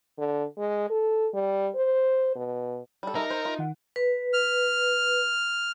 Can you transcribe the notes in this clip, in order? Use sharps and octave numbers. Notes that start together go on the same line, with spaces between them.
D3
G#3
A4
G3
C5
B2
G3 A4
D#4 A#4 E5
C5
F4
D#3 F#5
B4
F6